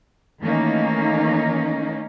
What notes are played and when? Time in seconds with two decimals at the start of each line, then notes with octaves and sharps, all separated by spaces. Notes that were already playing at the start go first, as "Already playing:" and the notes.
0.41 D#3 E3 A3 A#3 C#4 D#4